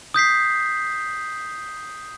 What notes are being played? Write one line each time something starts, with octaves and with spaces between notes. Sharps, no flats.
D#6 G6 B6 C7